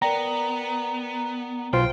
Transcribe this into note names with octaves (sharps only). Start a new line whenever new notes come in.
B3 A#4 D5 G5 A#5
B1 F4 C5 G5 F6 C7